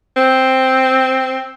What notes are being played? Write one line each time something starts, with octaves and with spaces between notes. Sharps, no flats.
C4